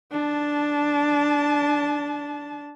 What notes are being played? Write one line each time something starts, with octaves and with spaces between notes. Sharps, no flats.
D4 A5